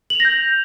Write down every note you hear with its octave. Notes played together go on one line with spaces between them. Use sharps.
G6 A#6 F7 F#7